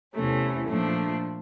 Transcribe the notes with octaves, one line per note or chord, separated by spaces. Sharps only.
E2 C3 E3 A3 C#4
A#2 F3 A3 D4